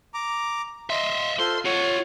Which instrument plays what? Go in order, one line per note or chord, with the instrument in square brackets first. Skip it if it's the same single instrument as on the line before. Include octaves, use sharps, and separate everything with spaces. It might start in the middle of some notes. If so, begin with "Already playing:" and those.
[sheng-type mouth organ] A#5 D6
[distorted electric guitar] D#5 E5 [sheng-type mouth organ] C6
[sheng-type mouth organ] F4 A4 C5 [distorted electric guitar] C6
[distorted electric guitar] F4 F#5 [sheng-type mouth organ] C#5